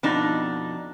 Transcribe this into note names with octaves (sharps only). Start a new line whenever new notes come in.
F2 B2 D4 D#4